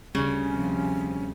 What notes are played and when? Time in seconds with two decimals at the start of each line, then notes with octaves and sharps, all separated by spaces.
0.15 D2 C#3 G3 C#4
0.49 C3 F3